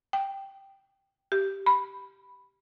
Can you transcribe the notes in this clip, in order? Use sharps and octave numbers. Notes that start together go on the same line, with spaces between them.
G5
G4
B5